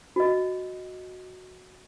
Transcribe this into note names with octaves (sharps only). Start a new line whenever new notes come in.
F#4 D#5